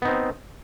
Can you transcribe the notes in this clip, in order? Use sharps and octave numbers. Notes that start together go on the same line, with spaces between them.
B3 C4 D#4